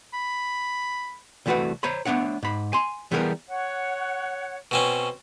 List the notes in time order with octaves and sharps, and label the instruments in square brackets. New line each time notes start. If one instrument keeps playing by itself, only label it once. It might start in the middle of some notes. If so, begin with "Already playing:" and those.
[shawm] B5
[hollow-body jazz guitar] C2 E3 A3 F#4 B4 F#5
C5 C#5 A#5 B5
A3 B3 D4 C#5 F#5
G#2 B5
G#5 C6
E3 G3 B3 G#4 A#4
[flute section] C#5 F#5
[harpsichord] B2 C4 C#4